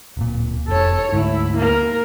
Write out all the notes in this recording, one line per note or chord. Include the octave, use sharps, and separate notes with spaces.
D1 A#2
F1 A4 C#5
D2 G#2 E4
A#3 A#4